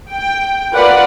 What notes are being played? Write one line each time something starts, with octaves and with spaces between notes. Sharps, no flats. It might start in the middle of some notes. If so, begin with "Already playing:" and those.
G5
F4 A#4 B4 D5 F#5